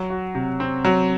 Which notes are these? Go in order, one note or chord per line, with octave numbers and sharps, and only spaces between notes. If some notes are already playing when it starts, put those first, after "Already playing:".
Already playing: F#3
F#4
C3
C4
F#3